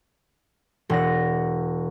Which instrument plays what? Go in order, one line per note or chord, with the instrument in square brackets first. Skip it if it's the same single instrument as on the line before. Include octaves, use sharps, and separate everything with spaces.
[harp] E1 F#5 A#6